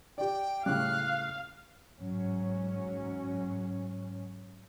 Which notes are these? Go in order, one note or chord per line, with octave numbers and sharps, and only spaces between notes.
G4 D5 G5
A2 C#3 G3 F5 F#6
G#2 F#3 C#4